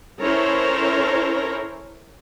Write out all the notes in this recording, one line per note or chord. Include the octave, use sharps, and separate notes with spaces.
C#4 E4 A4 A#4 C5 C#5